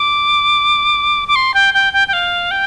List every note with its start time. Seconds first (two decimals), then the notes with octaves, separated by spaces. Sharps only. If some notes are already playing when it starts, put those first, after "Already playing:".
Already playing: D6
1.28 D6
1.36 C6
1.54 G5
1.74 G5
1.93 G5
2.08 G5
2.13 F5
2.51 G5